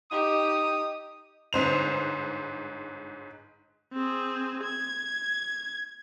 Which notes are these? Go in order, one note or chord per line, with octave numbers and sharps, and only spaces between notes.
D#4 G4 D#5 D#6
G1 G#2 C5 F7
C4 G#4
G#6